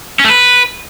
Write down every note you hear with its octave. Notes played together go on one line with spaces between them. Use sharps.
C#4
A3
B4